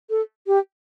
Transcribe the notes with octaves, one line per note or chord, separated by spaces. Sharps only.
A4
G4